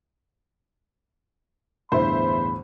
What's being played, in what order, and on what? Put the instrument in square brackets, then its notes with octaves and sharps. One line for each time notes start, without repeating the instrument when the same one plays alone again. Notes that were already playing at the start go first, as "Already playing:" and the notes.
[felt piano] G1 A2 [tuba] E2 [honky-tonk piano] C5 E5 [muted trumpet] B5